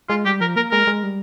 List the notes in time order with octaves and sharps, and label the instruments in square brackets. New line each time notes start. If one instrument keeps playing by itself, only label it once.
[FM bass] G#3 [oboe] F4
[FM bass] G3 [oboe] G4
[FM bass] F3 [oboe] A#4
[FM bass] A#3 [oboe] A#4
[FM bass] G#3 [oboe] A#4
[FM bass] G#3
G3